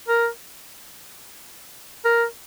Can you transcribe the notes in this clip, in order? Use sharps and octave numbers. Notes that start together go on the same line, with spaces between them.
A#4
A#4